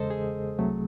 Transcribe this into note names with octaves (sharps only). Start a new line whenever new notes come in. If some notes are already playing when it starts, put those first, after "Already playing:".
Already playing: E2 C#3 G#3 A4 C5 D#5
G#4
C2 C3 F#3 A3